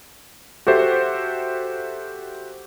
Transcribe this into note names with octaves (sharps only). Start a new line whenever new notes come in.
F#4 G4 A4 C5 E5